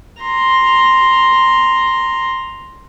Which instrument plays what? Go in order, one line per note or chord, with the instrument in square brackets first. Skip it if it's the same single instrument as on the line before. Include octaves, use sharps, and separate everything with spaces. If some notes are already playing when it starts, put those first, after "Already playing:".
[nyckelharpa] A#5 C6